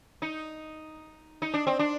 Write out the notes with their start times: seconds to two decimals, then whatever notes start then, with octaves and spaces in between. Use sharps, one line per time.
0.22 D#4
1.42 D#4
1.54 D4
1.67 C4
1.79 D4